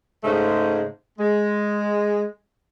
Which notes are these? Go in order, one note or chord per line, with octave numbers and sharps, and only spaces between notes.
G#2 C#3 G#3 A3 C5
G#3